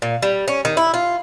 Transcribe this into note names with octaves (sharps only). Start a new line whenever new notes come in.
A#2
G3
C#4
D#3
E4
F4